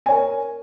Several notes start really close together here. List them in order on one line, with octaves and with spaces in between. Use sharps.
G#5 C#5 A#4